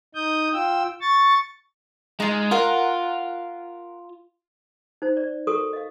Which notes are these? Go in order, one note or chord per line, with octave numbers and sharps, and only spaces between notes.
D#4 D#6 G6
F4 G5 E6
C#6 A6
G#3 D#4 F4
F4 A#4 F#5
D#4 C5
D5
F#4 A4 A#4 C#6 D#6
D#5 F5